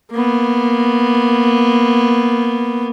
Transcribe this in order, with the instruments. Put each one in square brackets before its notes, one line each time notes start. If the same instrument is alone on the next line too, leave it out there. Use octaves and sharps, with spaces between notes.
[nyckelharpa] A#3 B3